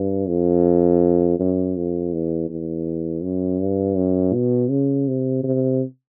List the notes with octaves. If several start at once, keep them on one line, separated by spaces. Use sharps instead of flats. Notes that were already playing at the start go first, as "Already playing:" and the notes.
Already playing: G2
F2
F#2
F2
E2
E2
F#2
G2
F#2
B2
C#3
C3
C3